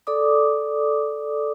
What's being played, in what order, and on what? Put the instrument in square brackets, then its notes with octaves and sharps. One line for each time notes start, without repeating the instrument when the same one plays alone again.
[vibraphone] A4 D5 D6 D#6